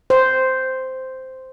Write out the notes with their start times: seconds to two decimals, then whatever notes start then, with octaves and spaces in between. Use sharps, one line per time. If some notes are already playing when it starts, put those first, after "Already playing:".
0.10 C5